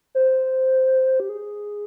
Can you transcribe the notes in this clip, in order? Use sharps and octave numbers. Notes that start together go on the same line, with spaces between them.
C5
G4
G#4